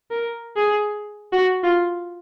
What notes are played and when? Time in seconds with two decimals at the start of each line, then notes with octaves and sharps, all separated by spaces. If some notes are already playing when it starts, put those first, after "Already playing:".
0.11 A#4
0.57 G#4
1.32 F#4
1.63 F4